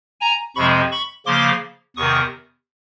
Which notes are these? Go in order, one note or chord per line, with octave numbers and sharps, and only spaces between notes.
G#5 A#5
F2 C3 F3 G#3 C4 B5 C#6
B5 C#6
C#3 F3 A#3 C6 D6
E2 C3 D#3 C#6 D#6